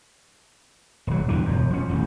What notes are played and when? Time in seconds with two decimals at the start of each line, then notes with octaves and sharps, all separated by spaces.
1.07 D#1 F#3
1.29 E2 G2 C#3 E3
1.45 E1 F#2
1.71 F3 C#4
1.89 D#1 A1 E2